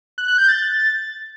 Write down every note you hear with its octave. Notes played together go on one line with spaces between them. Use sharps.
F#6
F#6
G6
A6